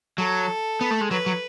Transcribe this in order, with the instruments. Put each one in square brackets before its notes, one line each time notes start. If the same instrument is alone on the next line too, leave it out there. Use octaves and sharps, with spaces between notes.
[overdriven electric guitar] F#3 [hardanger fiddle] A4
[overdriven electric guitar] B3
A3
G#3
[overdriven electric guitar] F#3 [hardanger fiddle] B4
[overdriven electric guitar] F#3